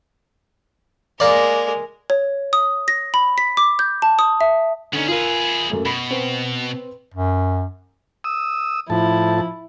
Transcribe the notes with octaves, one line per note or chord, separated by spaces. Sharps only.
G#3 A#3 A#4 D5
C#5
D#6
A#6
B5
B6
D6
G6
A5
D#6
E5
D3 B3 C#4 D#4
F4 G#4 A#4 B4
F#2 A3 A#3
B2 B5
C4 B4
F#2
D#6 E6
A2 F3 E4 A5